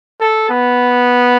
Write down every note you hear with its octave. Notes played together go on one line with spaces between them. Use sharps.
A4
B3